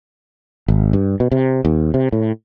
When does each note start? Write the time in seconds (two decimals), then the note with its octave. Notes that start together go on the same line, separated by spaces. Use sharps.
0.68 G#1
0.93 G2
1.20 B2
1.32 C3
1.65 D#2
1.94 C3
2.12 A2